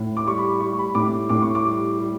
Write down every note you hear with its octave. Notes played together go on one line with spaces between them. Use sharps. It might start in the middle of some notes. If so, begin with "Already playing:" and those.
Already playing: A2
D6
G3 C#6
B5
G3 C#6
B5
A2 D6
A2 D6
C#6
D6
G3
G3